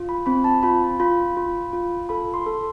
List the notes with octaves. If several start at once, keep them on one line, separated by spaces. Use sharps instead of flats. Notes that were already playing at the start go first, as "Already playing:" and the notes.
Already playing: F4
B5
C4 B5
A5
F4 B5
F4 B5
F4
F4
A4 B5
C6
A4